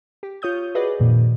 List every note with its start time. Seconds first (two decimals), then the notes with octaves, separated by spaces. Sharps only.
0.23 G4
0.42 F4 C#5 D#6 G6
0.75 F#4 G#4 B4 D5 D#5
0.99 F2 A#2 D#3